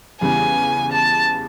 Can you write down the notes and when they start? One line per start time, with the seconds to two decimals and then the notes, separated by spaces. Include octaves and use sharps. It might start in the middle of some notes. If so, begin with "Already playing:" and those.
0.21 E2 C#3 E3 G3 B3 G#5
0.92 A5